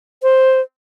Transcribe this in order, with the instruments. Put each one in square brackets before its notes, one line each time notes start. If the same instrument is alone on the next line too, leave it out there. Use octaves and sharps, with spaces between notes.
[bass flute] C5